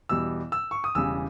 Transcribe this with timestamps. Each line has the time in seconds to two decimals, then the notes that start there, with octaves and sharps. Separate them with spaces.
0.09 E2 B2 G3 E6
0.52 E6
0.71 C#6
0.84 D#6
0.95 E1 E2 C#3 G3 E6